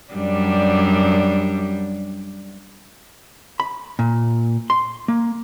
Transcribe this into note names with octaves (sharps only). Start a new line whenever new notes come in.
F#2 G3 D4
B5
A#2
C6
A#3